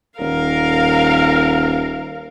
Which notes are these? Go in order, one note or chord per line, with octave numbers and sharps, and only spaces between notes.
D#1 A#4 F5